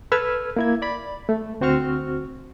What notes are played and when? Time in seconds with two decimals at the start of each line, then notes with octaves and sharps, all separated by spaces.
0.12 A4 B4 E6 F6 G#6
0.57 A#3 E4 G#6
0.82 D5 B5
1.29 A3
1.61 D2 C4 F#4 C5 C#6 F6